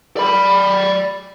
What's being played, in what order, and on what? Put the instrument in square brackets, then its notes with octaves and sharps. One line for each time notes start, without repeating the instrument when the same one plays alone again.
[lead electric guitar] D5 B5